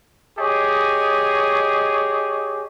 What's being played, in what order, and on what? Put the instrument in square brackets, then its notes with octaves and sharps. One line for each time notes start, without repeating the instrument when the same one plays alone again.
[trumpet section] G4 G#4 C#5 D#5